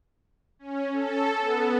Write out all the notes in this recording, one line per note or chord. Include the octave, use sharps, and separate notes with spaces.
C#4
A4
B3